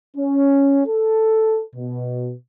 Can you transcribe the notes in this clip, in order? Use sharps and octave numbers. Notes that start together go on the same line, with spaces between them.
C#4
A4
B2